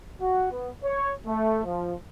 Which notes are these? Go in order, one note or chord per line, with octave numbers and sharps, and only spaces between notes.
F#4
B3
C#5
A3
F3